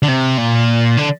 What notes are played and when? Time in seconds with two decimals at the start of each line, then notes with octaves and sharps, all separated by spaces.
0.02 D3
0.08 C3
0.38 A#2
0.97 D3